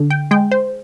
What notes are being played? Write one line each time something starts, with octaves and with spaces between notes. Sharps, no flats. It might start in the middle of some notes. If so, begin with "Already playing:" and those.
Already playing: D3
G5
G#3 G5
C5